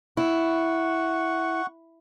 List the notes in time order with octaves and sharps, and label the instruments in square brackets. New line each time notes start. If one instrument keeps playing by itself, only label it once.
[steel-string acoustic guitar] E4 [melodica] F#5 C#6